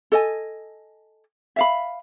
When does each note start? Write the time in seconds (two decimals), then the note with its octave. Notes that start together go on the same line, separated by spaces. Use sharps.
0.12 A4 D#5 G#5
1.56 E5 F5 B5